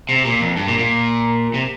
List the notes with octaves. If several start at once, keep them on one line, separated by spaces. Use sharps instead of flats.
C3
A#2
F2
G2
A#2
A#2
C3